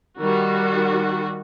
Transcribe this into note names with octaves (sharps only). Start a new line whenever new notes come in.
D#3 G3 F#4